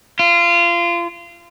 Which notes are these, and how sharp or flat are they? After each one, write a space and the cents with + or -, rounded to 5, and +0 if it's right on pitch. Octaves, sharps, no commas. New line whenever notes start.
F4 -25